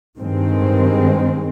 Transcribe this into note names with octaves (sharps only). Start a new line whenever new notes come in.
G2 D#3 G#3 C4